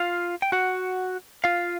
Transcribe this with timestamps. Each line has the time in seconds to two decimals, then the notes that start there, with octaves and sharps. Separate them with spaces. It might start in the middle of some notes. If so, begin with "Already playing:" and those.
Already playing: F4 F5
0.42 G5
0.52 F#4 F#5
1.44 F4 F5